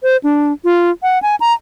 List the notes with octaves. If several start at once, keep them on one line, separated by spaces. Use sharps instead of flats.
C5
D4
F4
F#5
G#5
A#5